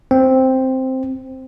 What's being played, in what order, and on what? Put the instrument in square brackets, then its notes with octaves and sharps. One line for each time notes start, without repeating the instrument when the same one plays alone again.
[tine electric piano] C4